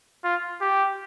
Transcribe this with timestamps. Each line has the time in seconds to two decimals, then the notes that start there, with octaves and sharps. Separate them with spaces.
0.24 F4
0.61 G4